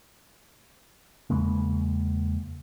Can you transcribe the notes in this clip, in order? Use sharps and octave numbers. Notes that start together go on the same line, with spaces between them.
E2 C#3 G#3 A#3